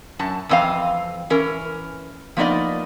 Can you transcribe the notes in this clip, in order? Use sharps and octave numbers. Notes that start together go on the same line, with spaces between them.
F#2 A5
F2 E3 C4 D#5 F5
E3 C#4 A#4
F3 A#3 B3 D#4 D5 D#5